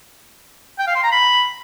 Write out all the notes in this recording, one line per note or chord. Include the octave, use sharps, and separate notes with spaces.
G5
F5
C6
A#5
B5